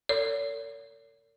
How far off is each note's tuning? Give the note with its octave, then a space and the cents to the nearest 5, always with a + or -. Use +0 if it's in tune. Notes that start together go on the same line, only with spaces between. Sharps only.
A#4 -45 C#5 +45